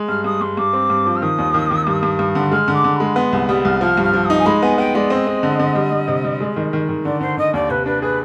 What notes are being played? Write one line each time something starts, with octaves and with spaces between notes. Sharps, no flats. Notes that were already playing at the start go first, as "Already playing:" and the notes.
Already playing: G#3
G2 F6
G2 D#6
G2 C6
G2 D6
C4
G2
F3
F6
D#3 D#6
D#2
D#3
D#3
G2
G2
G2
D3
G#3 F6
D3
D6
D3
G#3 B5
B3 C6
C2
G3 D#6
C2 F6
F3 F6
G2
F6
F3
D#6
D#4
G#5
G#3 B5
B3 G#5
B3 G5
G#3 D5
C4 D#5
C4
D3
D3
G3
G3
C3
G3
G#3
D#3
D#3
D#3
D3 D5
D3 C5
D3 D#5
D#2 D5
C3 B4
D4 B4
G#4 B4